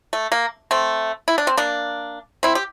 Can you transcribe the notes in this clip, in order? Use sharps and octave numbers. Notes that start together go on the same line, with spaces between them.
A3
A#3
A3 C4
E4
D4
C4
A#3 D4
C4 E4
G4